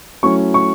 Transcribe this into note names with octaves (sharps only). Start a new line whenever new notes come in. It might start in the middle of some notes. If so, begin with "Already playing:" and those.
F#3 A3 C#4 E4 C#6
C#6